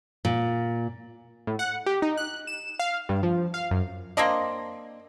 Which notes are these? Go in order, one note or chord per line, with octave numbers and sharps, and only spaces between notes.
A#2
A2
F#5
G4
D#4
F#6
E7
F5
G2
F3
F5
F#2
A#3 C4 D4 D#5